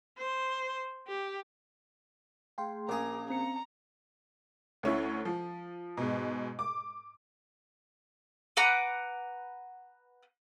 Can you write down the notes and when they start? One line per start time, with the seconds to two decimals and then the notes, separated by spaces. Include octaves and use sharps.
0.18 C5
1.07 G4
2.58 A3 G#4 F5 G5 C6
2.89 A#1 C#4 G#4 A#4 F5 A#5 D6
3.30 C4 A#5 C#7
4.83 D2 C#4 E4
5.25 F3
5.97 G#2 B2
6.59 D6
8.57 B4 F#5 A#5 D6